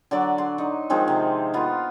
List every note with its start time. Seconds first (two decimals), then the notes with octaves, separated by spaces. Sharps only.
0.11 D3 F#3 D5 D6
0.38 C6
0.58 D#4
0.90 D#3 F3 G#3 C4
1.08 C3
1.54 A#3 B3 F4